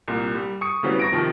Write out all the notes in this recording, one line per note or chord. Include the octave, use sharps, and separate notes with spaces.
C2 A#2
G3
C#6 D#6 C#7
C#3 E3 F#3 G3 B3 C4
C#6 A#6 D7
C3 D#3 F3